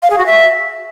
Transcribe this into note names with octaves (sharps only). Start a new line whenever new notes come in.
F5
G#4
F#4
E5